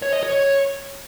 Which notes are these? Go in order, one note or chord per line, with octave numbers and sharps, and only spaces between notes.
C#5
D#5
C#5